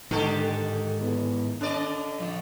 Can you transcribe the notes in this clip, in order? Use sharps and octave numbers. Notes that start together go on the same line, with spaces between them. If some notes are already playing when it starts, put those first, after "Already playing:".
G#2 D3 D#3 G4 A4
E2
D3 C#4 D5 D#5
F3 D4